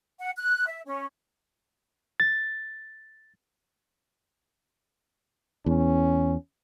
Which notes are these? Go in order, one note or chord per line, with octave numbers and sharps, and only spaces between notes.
F#5
F#6
E5
C#4
A6
E2 C#4